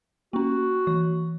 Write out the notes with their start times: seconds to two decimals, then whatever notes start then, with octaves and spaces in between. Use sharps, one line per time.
0.33 A#3 C#4 F#4
0.87 E3 C#6